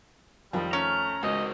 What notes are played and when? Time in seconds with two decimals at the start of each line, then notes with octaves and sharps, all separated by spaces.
0.53 F2 D#3 F3 G3
0.73 A3 C#4 A#5
1.23 C#2 F#4 A#4 C5 D#5